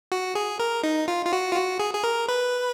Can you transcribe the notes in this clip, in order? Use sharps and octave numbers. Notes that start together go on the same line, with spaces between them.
F#4
G#4
A#4
D#4
F4
F4
F#4
F4
F#4
G#4
G#4
A#4
B4